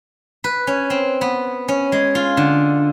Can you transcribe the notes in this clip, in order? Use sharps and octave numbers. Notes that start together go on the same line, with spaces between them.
B4
C#4
C4
B3
C#4
G#3
F4
D3